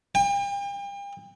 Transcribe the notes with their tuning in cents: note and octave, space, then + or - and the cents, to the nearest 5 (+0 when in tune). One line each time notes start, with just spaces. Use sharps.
G5 +40